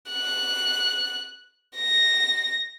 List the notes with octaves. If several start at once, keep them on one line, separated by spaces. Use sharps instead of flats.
F#6
A#6